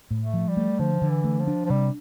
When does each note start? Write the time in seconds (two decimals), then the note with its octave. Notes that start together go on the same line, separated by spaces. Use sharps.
0.11 A2
0.19 A3
0.34 F3
0.49 G3
0.57 A3
0.79 D3 F3
1.02 D3
1.10 E3
1.24 A3
1.40 F3
1.47 D4
1.65 F3
1.70 C3 G3